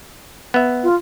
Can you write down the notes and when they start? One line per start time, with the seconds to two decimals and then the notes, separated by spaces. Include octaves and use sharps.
0.54 B3 E5
0.83 F4